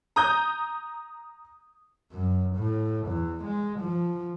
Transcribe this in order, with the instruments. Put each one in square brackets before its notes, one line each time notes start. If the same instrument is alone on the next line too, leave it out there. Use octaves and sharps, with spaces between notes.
[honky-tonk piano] A#5 D#6 G6
[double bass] F#2
A2
E2
G#3
F3